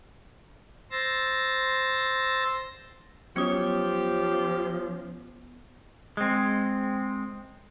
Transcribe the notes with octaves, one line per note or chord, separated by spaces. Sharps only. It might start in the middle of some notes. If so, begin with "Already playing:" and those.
C5 C6 E6 A6 A#6
F3 F#3 B3 C#4 G4 C#5 D#6
G#3 C4